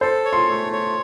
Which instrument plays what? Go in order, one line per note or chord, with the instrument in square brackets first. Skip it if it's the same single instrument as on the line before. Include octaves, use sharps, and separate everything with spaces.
[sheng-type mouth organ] A4 [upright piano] C5
[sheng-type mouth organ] C#5
[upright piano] C6
[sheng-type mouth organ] A3
C#5